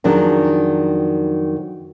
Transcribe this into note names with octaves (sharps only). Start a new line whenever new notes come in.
F2 D#3 F#3 D4 G#4